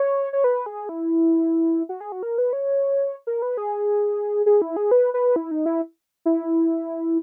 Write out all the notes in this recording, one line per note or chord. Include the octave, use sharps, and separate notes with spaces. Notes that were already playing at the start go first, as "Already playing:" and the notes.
Already playing: C#5
C#5
B4
G#4
E4
F#4
G#4
F#4
A#4
B4
C#5
A#4
B4
G#4
G#4
E4
G#4
B4
B4
E4
D#4
E4
E4